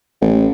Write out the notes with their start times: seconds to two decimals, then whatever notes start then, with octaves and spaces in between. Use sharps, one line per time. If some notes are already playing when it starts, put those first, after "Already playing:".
0.21 A1